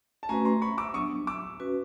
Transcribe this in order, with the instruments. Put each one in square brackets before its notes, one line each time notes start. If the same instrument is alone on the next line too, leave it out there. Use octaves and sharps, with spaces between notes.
[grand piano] A5
[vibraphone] A3 C#4 F#4 B4 [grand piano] G#5 A#5
[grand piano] A#5 C6
B5 C#6
D6 E6
[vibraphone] F#3 B3 D4 [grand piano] C#6 D#6
[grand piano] D6 E6
[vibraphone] C#4 F#4 B4